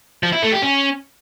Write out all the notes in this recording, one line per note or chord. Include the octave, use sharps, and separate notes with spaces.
F3
E4
A3
G4
C#4